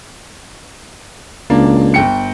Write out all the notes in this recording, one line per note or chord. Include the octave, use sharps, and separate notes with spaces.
C#2 A#3 D4
G1 G5 C#7